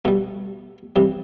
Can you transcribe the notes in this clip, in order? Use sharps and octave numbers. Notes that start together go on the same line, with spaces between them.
B2 G3 A3
C3 E3 G3